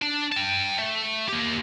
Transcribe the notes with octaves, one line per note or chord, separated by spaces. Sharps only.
D4
G5 A5
A3
A#3 G4